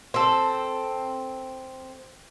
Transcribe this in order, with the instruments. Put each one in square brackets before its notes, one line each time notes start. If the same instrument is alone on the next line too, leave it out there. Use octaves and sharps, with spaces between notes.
[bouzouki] C4 A4